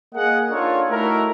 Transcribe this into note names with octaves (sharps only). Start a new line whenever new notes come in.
A#3 G#4 D#5 F#5
D4 D#4 F4 A4 A#4 C#5
A3 D#4 E4 F#4 A#4